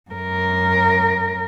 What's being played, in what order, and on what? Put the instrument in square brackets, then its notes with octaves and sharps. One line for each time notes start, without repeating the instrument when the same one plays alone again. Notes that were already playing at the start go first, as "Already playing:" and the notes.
[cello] F#2 A#4